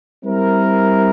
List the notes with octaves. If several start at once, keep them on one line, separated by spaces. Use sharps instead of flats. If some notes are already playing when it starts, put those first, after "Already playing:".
G3 C4 E4 A#4